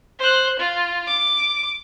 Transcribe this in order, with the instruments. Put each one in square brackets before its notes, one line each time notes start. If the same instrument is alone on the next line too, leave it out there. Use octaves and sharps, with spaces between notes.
[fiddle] C5 F#6
F4
D6